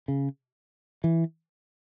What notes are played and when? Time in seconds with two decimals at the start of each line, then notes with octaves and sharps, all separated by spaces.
0.08 C#3
1.04 E3